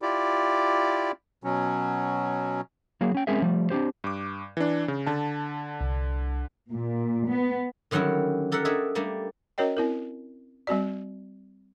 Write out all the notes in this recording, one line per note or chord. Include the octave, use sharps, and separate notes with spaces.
E4 F4 G4 D5
B2 F#3 C#4
F#3 A#3 F#4 G#4
C#4 G5
G#3 C4 C#4 G#4 A#4 E5
F3 G3 A3
C4 D4 D#4 G4 C5
G2 D6
E3 D4
C#3
D3 A5
C2
A#2
B3
D3 D#3 F#3 G3 C#4 E4
G4 A4 A#4 E5 F#5
D4 G#4 A4 C#5 D#5 E5
G3 A3 A#3 D4
C#4 F#4 A#4 C#5 D#5 G5
C4 E4 A#4
G3 C4 F#4 D5